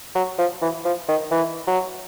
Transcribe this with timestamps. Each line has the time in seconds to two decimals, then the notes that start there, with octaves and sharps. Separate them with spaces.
0.15 F#3
0.38 F3
0.62 E3
0.85 F3
1.09 D#3
1.31 E3
1.67 F#3